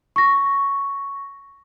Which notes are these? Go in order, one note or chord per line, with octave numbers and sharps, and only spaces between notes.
C#6 A#6